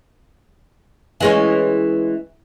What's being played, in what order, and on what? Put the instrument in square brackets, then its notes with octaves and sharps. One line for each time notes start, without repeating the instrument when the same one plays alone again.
[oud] E3 G#3 C#4